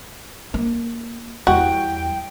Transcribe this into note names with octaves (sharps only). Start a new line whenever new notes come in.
A#3
E2 G3 F#4 G5